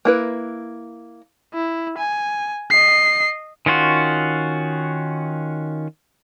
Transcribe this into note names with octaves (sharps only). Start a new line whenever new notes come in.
A#3 E4 B4
E4
G#5
D#5 C7
D#3 C#4 F4 F#4